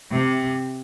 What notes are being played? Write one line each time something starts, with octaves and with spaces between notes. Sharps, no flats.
C3